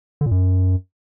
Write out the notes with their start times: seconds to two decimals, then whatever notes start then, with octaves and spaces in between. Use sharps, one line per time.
0.21 D3
0.26 A#2
0.31 F#2